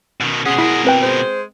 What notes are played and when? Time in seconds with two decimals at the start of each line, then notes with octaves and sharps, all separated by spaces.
0.21 B2 D#3
0.46 B2 G#3 C#4 G#4 F#5
0.58 B2 E4 A#4 B6
0.85 C4 B4 G5
1.01 G#3 C5